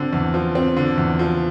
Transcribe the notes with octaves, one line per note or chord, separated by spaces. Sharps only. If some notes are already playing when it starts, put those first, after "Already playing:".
Already playing: D3 C4
E2
F3
C4
D3
E2
F3